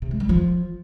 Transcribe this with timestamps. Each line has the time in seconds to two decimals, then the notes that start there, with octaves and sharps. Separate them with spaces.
0.02 C3
0.11 G#3
0.20 G3
0.29 F3